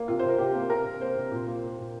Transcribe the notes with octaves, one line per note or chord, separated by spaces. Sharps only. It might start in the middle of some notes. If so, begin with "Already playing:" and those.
Already playing: A#3
C3 F4
C3 C5
A#4
C3 G4
A#3
C3 A#4
C3
A#3 C5
C3
A#2
A#3
A#3
A#2